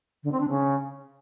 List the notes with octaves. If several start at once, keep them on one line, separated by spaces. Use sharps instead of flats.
D3
C4
D4
C#3